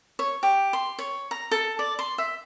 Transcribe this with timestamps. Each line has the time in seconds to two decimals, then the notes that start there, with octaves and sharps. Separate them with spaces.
0.19 C#5
0.43 G4
0.73 C6
0.99 C#5
1.31 A#5
1.51 A4
1.79 D5
1.99 C6
2.18 E5